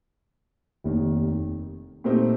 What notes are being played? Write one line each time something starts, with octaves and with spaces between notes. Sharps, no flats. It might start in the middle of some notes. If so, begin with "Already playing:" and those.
F1 D#2 D#3
A#2 A3 C4 D#4 G4